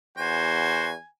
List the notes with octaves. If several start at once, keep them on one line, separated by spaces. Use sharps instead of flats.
E2 F#4 C5 G#5